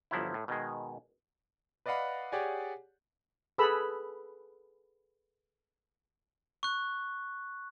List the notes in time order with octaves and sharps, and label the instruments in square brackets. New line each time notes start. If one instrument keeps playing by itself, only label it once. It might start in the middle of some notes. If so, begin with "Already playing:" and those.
[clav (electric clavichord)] G1 F3 F#3 E4
A2
B2 D#3 G#3
[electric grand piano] B4 D5 D#5 F5 F#5 B5
G4 G#4 C#5 D5 F#5 G#5
[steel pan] G#4 A4 B4 B5 E6
[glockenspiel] C#6 F#6